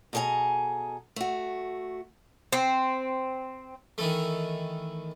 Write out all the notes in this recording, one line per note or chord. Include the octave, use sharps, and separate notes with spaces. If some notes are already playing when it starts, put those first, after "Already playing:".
B2 G#4 A4 D#5 G#5 A#5
A3 F#4
C4
D#3 E3 A3